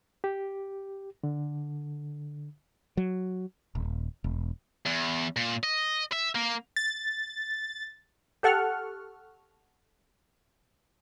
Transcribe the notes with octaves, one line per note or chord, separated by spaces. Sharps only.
G4
D3
F#3
D#1
E1
E2
A#2
D#5
E5
A#3
A6
G4 A4 F#5 C#6 F6